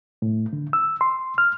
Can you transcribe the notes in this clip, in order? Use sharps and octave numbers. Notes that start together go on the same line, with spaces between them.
A2
D3
E6
C6
F6